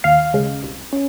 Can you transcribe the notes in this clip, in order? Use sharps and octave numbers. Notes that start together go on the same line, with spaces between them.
D#2 F5
C#3 G#3
C2
C#4